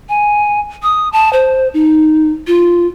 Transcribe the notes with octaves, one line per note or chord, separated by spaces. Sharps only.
G#5
D#6
A5
C5
D#4
F4